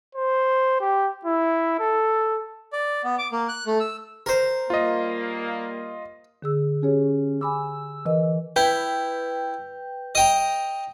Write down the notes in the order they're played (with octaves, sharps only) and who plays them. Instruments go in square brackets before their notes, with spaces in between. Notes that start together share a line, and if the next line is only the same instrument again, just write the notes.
[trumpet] C5
G4
E4
A4
[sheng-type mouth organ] D5
B3
D6
A#3
F#6
A3
E6
[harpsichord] A#4 C5
[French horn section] G3 A#3 [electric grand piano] F4 D#5
[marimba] D3 G#4 E6
[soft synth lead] C#4 [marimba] G4 G#4 C#5
[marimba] G#5 B5 D6 [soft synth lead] E6
[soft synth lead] E3 [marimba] A#4 D#5
[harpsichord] E4 [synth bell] B4 G5 G6
[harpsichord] D#5 G5 A#5